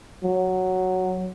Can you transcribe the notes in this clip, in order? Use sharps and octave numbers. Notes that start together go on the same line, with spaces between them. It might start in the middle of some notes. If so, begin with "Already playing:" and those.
F#3